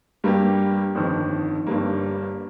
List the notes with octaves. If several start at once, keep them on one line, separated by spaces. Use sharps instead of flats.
G2 G3 A#3 G4
G1 F2 D#3
G1 G2 G3 A#3